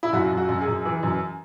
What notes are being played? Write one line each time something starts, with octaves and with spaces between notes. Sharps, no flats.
E4
F#2 F#4
F#2
F#4
F#2
G#4
F#2
E3
F#2